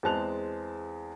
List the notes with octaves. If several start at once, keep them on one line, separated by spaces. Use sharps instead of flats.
E2 G#3 C4 A5 F#6 F7